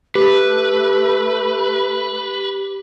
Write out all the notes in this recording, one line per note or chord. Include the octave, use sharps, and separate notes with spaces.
A3 G4 B4